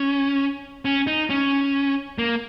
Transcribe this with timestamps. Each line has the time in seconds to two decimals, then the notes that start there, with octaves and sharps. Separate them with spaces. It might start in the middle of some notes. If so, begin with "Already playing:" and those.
Already playing: C#4
0.85 C#4
1.07 D#4
1.30 C#4
2.18 A#3